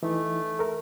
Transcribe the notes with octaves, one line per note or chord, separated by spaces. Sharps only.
E3 A3 D#4
A4 A#4